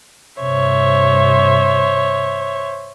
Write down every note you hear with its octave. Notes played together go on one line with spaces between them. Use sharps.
G2 C3 C5 C#5 E5